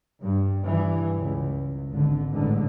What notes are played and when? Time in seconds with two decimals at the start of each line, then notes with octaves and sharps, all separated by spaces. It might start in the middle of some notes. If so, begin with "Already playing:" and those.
0.21 G2
0.62 G2 E3
1.20 C#2
1.89 G#1 D3
2.33 A1 G#2 D3